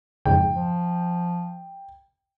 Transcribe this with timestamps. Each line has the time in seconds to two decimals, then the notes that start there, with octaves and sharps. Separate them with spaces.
0.25 F2 G#2 C#3 G5
0.55 F3